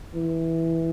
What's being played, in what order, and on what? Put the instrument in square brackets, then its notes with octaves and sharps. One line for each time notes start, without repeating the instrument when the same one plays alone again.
[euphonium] E3